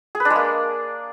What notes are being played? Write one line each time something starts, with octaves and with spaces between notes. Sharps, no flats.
G#4
B4
D4
G#3
A#3